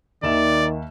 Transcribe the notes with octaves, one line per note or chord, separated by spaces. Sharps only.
D#2 D#3 D5 E5 E7